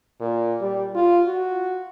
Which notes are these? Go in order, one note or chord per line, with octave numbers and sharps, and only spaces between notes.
A#2
G3
F4
F#4